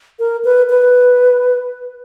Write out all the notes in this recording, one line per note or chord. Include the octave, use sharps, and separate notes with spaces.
A#4
B4
B4